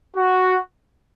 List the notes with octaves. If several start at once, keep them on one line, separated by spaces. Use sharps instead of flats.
F#4